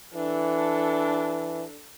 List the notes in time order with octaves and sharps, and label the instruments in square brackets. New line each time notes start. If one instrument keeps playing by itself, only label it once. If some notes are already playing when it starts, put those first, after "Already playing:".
[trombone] E3 [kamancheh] D4 A4